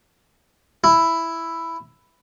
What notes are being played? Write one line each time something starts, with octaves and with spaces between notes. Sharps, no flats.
E4